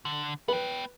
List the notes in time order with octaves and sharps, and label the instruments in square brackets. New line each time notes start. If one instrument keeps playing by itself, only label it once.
[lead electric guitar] D3
[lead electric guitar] B3 G5 [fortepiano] B4